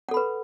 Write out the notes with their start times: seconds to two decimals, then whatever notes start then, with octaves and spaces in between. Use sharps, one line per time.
0.09 F#5
0.11 A4
0.14 B5
0.17 B4